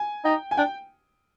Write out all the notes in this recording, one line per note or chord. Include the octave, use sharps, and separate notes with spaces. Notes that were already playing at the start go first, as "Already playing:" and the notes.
Already playing: G#5
D#4 G5
G#5
D4 G5